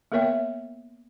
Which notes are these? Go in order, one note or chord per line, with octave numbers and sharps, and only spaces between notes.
A#3 B3 A#4 C#5 E5 G5